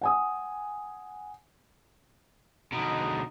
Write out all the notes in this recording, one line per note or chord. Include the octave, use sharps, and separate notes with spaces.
F#5 G#5 D#6
B2 D3 D#4